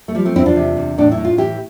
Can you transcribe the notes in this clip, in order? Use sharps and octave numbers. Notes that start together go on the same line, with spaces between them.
A3
F3 G3
A3 C4
E2 C4 E4
D4 F4
C3
E2
A2 D4
E4
A2
F4
E3 E4 G4